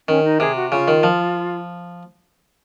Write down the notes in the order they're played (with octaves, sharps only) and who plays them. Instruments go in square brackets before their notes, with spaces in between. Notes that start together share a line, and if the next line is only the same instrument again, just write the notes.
[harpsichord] D#3 [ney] C#4
[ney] D#4
[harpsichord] C3 [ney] G#4
[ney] F#4
[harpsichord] C#3 [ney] F4
[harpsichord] D#3
F3